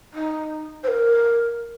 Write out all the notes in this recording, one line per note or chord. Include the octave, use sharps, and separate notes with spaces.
D#4
C5
A#4